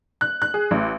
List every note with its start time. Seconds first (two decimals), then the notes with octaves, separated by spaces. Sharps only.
0.21 F#6
0.42 F#6
0.54 G#4
0.71 A1